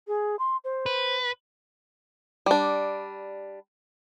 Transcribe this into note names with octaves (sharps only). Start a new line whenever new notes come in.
G#4
C6
C5
B4
G3 D4